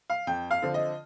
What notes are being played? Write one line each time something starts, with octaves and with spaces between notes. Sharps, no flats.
F5
F2 G5
F5
D3 F3 C4
D#5